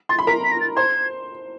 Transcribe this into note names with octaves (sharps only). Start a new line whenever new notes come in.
C6 A6
B5
A#4 A#5 B6
B6
A#6
A6
C5 C6 G#6